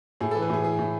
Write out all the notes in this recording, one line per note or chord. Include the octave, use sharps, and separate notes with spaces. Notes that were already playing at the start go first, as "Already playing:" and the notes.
A2 G#4
E3 A4
B4
A2 G#4
E3 G#4
A2